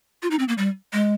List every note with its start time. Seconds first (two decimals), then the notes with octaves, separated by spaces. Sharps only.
0.22 F4
0.31 D#4
0.39 C4
0.48 A#3
0.58 G3
0.93 G#3